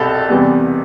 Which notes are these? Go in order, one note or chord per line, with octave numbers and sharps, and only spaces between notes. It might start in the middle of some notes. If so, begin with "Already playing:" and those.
Already playing: C2 B2 C4 G4 A4
E2 C3 G3 B3